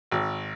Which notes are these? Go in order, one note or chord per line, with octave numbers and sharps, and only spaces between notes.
G#1